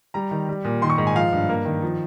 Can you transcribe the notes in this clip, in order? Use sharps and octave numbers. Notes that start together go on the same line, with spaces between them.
G3 A#5
D#3
G3
A#2
D#3 C6
C#6
G#2
G#5
F3 F5
G2
A#3
D#3
F3